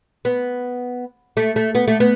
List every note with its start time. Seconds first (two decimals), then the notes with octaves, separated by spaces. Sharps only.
0.25 B3
1.37 A3
1.56 A3
1.75 B3
1.88 A3
2.00 B3